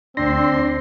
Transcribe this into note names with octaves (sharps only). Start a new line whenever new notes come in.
D2 C4 D4 C5 C6 A#6